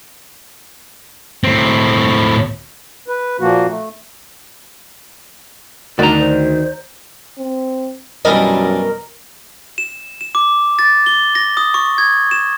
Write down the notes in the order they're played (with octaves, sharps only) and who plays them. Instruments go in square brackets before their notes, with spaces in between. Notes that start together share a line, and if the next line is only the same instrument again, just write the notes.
[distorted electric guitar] A2 C4
[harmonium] B4
A#2 F3 A#3 F#4
A3
[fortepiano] D2 [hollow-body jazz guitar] D#3 F#4 [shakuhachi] D4 [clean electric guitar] D5 A#5
[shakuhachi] C5
[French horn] C4
[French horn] F#2 [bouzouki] B2 D#5 [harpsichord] E3 G3 D4 [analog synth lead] A#4
[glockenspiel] E7
E7
D6
A6
G7
A#6
D#6
C#6
G#6
E7